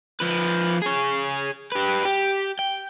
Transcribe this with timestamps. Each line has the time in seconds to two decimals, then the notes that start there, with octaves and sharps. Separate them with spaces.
0.20 F3 B4
0.82 G#4 C#5
1.72 G4 B4
2.05 G4
2.59 G5